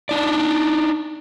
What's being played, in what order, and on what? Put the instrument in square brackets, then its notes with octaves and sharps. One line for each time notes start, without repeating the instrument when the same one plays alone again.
[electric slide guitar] D4 D#4 D5